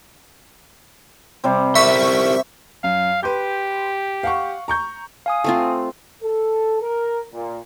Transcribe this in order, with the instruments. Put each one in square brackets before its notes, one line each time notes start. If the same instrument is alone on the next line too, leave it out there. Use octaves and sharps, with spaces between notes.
[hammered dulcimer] C3 G3 C4
[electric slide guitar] G4 A#4 C5 [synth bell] E5 C#6 B6
[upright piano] F#2 [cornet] F5
[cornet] G4 [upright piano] B4 C6 G6
[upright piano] F5 F#5 C#6
A#5 C#6 G6
[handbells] F5 G#5 D#6
[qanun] A3 C4 F4
[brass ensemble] A4
A#4
A#2